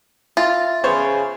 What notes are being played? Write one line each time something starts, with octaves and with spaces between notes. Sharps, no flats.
F4 E5 A6
C#3 B3 C5 C#5